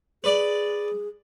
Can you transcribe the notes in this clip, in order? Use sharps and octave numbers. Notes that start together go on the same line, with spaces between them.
G#4 B4 D5